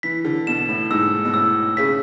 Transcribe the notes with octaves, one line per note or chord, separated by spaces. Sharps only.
E3 B6
D3
B2 E7
A2
G#2 E6
B2
A2 E6
C#3 B6